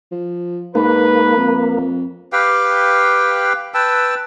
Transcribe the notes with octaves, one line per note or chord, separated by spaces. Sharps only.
F3
G#2 A#3 B4
F2
F2
G4 B4 F5 G5
B4 G5 A5 E6